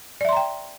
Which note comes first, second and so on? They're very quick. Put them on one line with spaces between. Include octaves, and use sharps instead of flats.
D5 E5 C6 A#5 G5